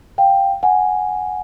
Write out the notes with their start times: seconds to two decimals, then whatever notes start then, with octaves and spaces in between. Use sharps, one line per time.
0.18 F5 G5
0.63 F#5 G#5